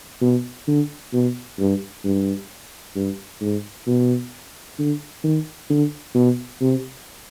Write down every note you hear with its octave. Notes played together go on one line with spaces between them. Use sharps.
B2
D3
B2
G2
G2
G2
G#2
B2
D3
D#3
D3
B2
C3